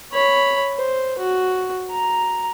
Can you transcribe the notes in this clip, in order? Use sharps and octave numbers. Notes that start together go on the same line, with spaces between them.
C#5 B5
C5
F#4
A#5